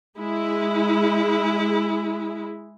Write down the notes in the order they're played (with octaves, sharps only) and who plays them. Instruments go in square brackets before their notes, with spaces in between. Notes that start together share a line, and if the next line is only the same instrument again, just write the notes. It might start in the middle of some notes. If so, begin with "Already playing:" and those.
[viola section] G#3 E4 G#4